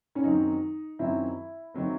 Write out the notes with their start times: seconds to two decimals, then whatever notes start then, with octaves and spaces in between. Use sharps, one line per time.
0.15 C#4
0.24 F#2 D#3 F#3 C4 D#4
0.99 F#2 D#3 F#3 C4 E4
1.74 D#3 F#3 C4